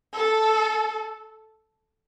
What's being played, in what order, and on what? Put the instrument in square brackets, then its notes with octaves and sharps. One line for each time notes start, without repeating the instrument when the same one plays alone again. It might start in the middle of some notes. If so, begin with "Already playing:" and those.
[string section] A4